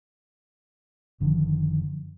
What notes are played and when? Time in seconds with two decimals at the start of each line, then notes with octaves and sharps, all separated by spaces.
1.20 F#1 D3 D#3 F3